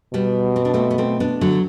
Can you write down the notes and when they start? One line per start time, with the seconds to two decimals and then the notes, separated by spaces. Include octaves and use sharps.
0.13 B2 G3 B3
0.56 C4
0.65 D4
0.74 A3 C4
0.91 B3
0.98 A3 C4
1.20 B3 D4
1.41 D3 F#3